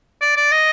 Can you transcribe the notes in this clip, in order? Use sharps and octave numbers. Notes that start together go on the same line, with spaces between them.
D5
D5
D#5